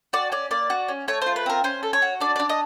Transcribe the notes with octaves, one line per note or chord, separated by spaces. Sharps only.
F#4 D5
C#4 D5
A#3 D5
F#4
C#4
A3 C#5
F4 C5
B4
C4 A#4
C#4 C5
A4
C#5
F#4
D4 D5
D4 D5
D#5